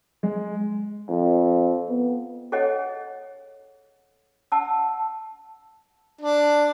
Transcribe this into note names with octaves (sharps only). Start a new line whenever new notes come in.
G#3
F2
B3
G#4 A4 C#5 D#5 F#5
F#5 A5 E6
D4